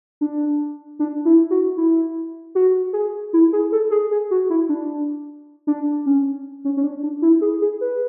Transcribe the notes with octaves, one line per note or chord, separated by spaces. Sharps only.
D4
D4
E4
F#4
E4
F#4
G#4
E4
G#4
A4
G#4
G#4
F#4
E4
D4
D4
C#4
C#4
C#4
D4
D4
E4
G#4
G#4
B4